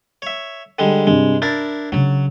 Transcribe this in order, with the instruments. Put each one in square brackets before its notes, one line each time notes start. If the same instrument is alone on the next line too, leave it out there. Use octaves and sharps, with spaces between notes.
[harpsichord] C#5 E5
D3 G3 G#3
[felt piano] G2 C3 [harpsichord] G#3
[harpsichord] D4 E4 A#4 [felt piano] A6
[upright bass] C#3 D4 [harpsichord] F#3